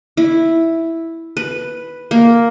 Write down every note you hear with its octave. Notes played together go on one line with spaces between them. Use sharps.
E4
B4
A#3